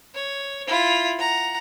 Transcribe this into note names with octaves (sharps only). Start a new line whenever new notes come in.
C#5
E4 F4
F#5 A#5